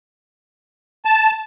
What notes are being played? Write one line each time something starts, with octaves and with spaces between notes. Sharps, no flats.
A5